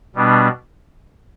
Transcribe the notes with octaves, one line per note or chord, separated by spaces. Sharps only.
B2 G3 B3 D4